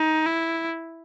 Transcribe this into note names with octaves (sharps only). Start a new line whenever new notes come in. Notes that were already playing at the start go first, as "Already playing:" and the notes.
Already playing: D#4
E4